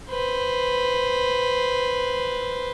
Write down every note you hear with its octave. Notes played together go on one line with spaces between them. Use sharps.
B4 C5